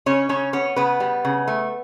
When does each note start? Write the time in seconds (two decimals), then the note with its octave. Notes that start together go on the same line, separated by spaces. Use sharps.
0.06 C#3 C#4 C#5
0.29 C#3 C#4 C#5
0.53 B3 C#4 C#5
0.76 C#3 B3 B4
1.00 G3
1.25 C#3
1.48 A3